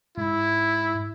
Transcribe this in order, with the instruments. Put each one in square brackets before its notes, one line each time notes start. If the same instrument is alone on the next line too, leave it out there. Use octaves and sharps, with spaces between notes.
[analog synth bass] G#2 [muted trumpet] E4